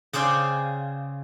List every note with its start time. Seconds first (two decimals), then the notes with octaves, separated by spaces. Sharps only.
0.13 C#3 G#4 C5 D5 F5 G5